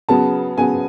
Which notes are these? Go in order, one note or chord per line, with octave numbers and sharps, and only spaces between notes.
C#3 F#3 B3 A5
C#3 F#3 B3 G#5